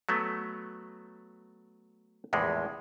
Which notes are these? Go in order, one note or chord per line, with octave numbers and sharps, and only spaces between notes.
F#3 A3 B3
A#1 E2 A2 C3 G#3